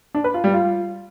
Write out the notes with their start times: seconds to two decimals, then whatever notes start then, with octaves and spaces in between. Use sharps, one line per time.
0.15 D4
0.24 B4
0.34 F4
0.44 G3
0.54 F4